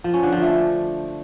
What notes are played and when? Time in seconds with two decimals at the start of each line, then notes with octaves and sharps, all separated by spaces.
0.04 F3
0.14 C#4
0.23 D3
0.32 F3
0.42 A3